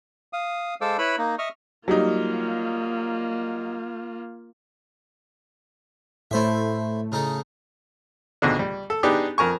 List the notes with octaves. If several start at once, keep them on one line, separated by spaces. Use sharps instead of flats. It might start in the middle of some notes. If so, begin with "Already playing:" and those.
F5 D#6
G#3 A4 C5 F5 D6 E6
E4 B4 C#5 B5 E6 F#6
A#3 D#4
D#5 E5 C#6 D#6 F6
F#3 G3 A#3 D#4 F4
A2 A3 E4 C5 E5
C#3 D#4 A4
C#2 G#2 B2 D3
G3
A4
B3 D4 D#4 G4 G#4
F2 A#4 G#5 C#6